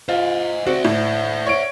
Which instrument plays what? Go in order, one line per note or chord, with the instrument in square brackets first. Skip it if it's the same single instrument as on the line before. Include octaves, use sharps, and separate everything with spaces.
[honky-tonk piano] F4 [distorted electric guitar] C5 D#5
[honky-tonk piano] C4 F#4 [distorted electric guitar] D5 E5
[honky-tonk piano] A2
C#5 D7